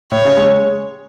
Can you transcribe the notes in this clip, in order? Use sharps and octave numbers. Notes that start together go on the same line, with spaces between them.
A2 C#5
C#3
G#3